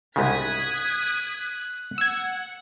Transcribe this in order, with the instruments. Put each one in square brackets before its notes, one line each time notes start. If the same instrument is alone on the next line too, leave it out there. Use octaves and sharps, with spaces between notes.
[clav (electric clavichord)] C2 G#2 C#3 [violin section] D#6 G#6 B6 [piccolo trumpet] F#6
[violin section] F#5 [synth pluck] E6 G#6